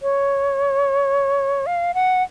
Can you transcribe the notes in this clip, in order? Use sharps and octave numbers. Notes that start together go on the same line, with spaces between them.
C#5
F5
F#5